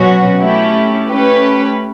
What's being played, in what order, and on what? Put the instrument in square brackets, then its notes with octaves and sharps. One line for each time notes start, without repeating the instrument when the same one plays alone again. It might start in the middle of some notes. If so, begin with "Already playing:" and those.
Already playing: [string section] B2 F#3 C#4 F#4
A3 C#4 E4 G4
A3 C#4 G4 B4